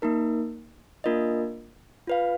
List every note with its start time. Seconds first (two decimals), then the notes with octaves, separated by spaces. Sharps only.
0.02 A#3 D#4 A#4
1.04 A#3 D4 F4 A#4 D#5
2.07 F4 B4 F5